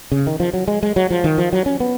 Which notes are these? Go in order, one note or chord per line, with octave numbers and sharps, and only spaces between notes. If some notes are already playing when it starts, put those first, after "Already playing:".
C#3
D#3
F3
F#3
G#3
G#3
F#3
F3
D#3
F3
F#3
C#4
B3